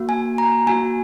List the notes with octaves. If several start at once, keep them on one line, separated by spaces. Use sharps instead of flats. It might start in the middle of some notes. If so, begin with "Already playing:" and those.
Already playing: A#3 F#4
G#5
A#5
A#3 F#4 G#5